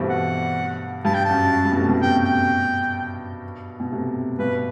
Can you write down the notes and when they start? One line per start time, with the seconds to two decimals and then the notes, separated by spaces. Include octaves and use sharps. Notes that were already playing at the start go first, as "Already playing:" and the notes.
Already playing: G2 B2 E3 G3 A3 C4
0.09 F#5
1.05 G2 A5
1.14 G5
1.24 F#2 A5
1.53 F#2
1.65 G2
1.72 B2
1.76 A2 C3
1.88 G2 B2
2.00 G2 B2 G5
2.24 G5
3.80 B2
3.92 A2 C3
4.39 G2 B2 B4